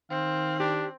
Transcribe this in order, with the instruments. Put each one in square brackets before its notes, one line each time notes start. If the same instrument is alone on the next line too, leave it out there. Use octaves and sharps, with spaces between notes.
[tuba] D#3 [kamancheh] C4 [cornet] F5
[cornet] D4 [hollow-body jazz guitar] G4